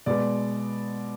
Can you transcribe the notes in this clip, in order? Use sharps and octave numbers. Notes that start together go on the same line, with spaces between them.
B2 G#3 B3 D5